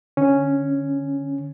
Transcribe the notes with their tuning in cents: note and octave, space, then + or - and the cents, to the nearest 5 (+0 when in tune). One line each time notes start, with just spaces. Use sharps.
D3 +0 C#4 +0